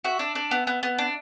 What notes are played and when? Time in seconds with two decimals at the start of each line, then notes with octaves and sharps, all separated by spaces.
0.04 F#4 E5
0.19 D4
0.35 D4
0.51 B3
0.67 B3
0.83 B3
0.98 D4